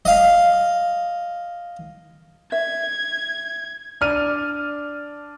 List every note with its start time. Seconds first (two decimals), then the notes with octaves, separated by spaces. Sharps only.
0.05 D#5 F5
2.52 E5 G#6
4.01 D4 F6 D#7